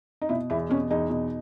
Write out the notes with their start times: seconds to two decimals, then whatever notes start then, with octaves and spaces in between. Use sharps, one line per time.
0.21 D#4
0.29 B2 E4
0.50 E2 E4
0.70 B2 C#4
0.90 E2 D#4
1.10 B2